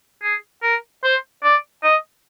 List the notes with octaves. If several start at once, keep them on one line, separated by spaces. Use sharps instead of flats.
G#4
A#4
C5
D5
D#5